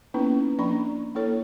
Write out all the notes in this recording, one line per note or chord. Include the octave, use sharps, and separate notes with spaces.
A#3 B3 C#4 D#4 E4 B4
F3 A#3 D4 D5 B5 C#6
A#3 E4 A4 C#5